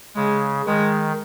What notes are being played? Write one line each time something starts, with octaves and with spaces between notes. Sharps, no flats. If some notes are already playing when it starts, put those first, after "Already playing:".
C#3 G#3
D#3 G#3